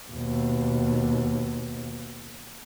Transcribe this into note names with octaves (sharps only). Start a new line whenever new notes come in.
D#2 B2